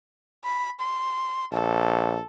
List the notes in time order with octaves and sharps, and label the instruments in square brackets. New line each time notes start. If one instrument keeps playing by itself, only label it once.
[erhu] B5
C6
[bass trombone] A#1 [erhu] A4